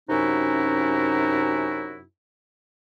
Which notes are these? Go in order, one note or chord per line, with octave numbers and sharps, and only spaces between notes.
F#2 C3 C#4 D#4 E4 F#4